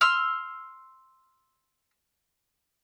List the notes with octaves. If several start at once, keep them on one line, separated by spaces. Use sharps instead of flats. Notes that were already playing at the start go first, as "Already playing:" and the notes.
C6 E6 F6